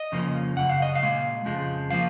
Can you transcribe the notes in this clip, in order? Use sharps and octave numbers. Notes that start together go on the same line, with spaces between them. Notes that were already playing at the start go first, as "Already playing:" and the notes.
Already playing: D#5
F2 C#3 F3 A#3
F#2 C#3 F#5
F5
D#5
F5
A#2 G#3
F2 C#3 F3 G#3
F3 A#3 F5